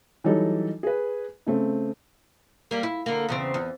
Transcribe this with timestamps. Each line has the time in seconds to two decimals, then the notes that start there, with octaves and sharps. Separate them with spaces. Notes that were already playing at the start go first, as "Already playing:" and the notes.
0.24 E3 F#3 G3 D#4 A4
0.83 G#4 B4
1.47 C#3 A3 C4
2.71 G3 A#3
2.83 E4
3.06 D3 A#3
3.29 E2 C#3 C4
3.54 E2